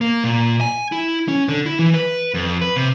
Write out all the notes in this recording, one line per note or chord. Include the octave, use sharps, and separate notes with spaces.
A#3
A#2
G#5
E4
C#4
D3
E4
E3
B4
F2
B4
C3